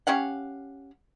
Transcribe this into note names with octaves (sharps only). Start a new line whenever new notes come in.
C#4 G4 F5 F#5